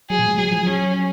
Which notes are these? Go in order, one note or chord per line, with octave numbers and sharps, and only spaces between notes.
F#3 G#4
A#2
G#3
F#3 G#4
F3
F#3 C#4